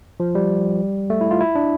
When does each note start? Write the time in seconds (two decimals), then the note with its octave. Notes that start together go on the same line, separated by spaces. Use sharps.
0.20 F3
0.35 G3
1.10 A3
1.21 E4
1.31 F4
1.41 E4
1.55 D4